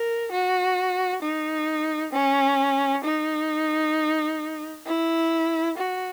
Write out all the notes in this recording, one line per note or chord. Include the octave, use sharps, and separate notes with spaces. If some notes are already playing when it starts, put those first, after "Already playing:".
Already playing: A#4
F#4
D#4
C#4
D#4
E4
F#4